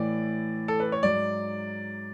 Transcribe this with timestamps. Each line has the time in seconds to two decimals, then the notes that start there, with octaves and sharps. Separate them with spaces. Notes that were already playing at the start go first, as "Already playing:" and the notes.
Already playing: A2 E3 D5
0.68 A4
0.80 B4
0.92 C#5
1.03 G#2 F#3 D5